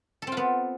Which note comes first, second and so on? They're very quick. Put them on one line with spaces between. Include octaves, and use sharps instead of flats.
A4 C4 F4 B3